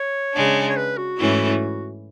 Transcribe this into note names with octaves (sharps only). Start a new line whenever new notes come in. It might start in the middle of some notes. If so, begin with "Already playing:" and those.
Already playing: C#5
C#3 G#3 D4
C#5
B4
F#4
G#2 E3 A3 C#4 E4